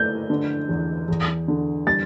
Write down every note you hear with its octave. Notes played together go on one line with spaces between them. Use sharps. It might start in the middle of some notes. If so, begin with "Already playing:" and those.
Already playing: A3 G6
D3
E2
E2
D3
G3 A6